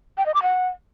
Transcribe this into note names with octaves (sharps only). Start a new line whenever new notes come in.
G5
D#5
D6
F#5